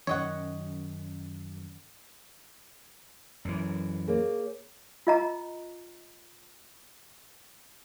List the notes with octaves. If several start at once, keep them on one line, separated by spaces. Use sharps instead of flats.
F#2 D#3 C#4 C#5 D#5 F#5
F#2 E3
A#3 G#4 A#4 C#5
F4 D#5 A#5